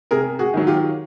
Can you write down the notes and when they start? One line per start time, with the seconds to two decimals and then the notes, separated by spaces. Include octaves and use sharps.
0.11 C3 G#4 A#4
0.39 F#4 G#4
0.54 D#3 F#3
0.67 F4 G4